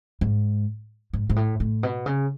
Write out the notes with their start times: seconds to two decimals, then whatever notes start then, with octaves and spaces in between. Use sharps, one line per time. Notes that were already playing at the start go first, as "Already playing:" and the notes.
0.21 G#2
1.13 G#2
1.29 G#2
1.36 A2
1.60 A2
1.83 B2
2.06 C#3